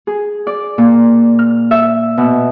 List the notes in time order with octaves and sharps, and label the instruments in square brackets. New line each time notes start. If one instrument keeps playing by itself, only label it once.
[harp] G#4
D5
A#2
F6
E5
B2